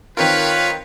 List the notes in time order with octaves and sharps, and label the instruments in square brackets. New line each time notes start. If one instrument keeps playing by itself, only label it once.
[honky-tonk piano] D#3 C4 A#4 [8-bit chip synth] F4 C#5 F5 [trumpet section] B4